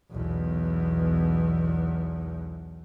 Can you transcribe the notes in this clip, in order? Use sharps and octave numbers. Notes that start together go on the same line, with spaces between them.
B1 E2